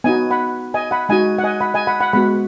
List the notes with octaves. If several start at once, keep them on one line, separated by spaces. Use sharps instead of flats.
B3 D#4 F#4 D#5 G#5
F#5 B5
D#5 G#5
F#5 B5
G#3 D#4 F#4 D#5 G#5
F#5
D#5 G#5
F#5 B5
D#5 G#5
F#5 B5
F#5 B5
G#3 B3 F#4 F#5 B5